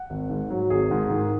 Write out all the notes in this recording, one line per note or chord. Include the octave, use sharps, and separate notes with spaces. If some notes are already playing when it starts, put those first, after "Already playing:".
Already playing: F#5
G#1
G#2
F#3
G#1 G#4
G#2
D#3